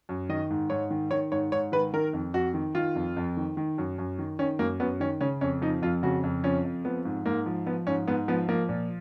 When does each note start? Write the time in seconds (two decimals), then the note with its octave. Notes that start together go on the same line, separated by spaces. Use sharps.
0.09 F#2
0.29 D#3 D#5
0.50 G#2
0.70 G#2 C#5
0.91 D#3
1.11 D#3 C#5
1.32 G#2 C#5
1.52 G#2 C#5
1.72 D#3 B4
1.93 D#3 A#4
2.13 F2
2.34 F2 F#4
2.54 D#3
2.75 D#3 F4
2.95 F2
3.17 F2
3.37 D#3
3.57 D#3
3.78 F#2
3.98 F#2
4.19 D#3
4.39 D#3 C#4
4.59 F#2 A#3
4.80 F#2 B3
5.00 D#3 C#4
5.21 C#3 C#4
5.41 F2 C#4
5.62 F3 D#4
5.82 F2 F4
6.03 C#3 F#4
6.23 F2
6.44 F3 C#4
6.64 F2
6.85 F3 B3
7.05 G#2
7.26 G#2 A#3
7.46 F3
7.66 F3 B3
7.87 G#2 C#4
8.07 G#2 B3
8.28 F3 B3
8.49 F3 A#3
8.69 A#2